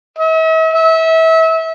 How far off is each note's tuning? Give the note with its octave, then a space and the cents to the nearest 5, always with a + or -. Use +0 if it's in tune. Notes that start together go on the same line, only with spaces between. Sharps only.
E5 -45
E5 -30